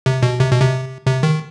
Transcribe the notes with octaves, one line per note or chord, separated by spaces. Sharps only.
C3
B2
C3
B2
C3
C3
D#3